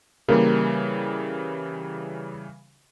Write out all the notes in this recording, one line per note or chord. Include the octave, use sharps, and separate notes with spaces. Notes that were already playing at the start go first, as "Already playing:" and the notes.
C#3 E3 G3 A#3